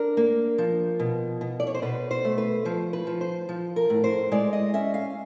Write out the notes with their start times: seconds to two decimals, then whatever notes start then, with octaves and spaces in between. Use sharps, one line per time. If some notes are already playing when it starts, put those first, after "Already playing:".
Already playing: D4 A#4
0.17 A#3
0.58 F3
0.99 B2
1.41 B2
1.60 D5
1.67 C#5
1.74 C5
1.82 B2 B4
2.11 C5
2.25 A3
2.38 B4
2.65 F3 C5
2.93 B4
3.07 F3
3.21 C5
3.49 F3
3.76 A#4
3.90 A2
4.04 C5
4.32 G#3 D5
4.53 D#5
4.74 C#4 E5
4.94 F5